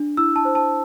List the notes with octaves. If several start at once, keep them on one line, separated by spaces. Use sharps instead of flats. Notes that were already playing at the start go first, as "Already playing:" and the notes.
Already playing: D4
E4 E6
A5
C5
A5